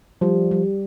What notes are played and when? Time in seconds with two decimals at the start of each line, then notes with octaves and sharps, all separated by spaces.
0.21 F3 G3
0.51 G3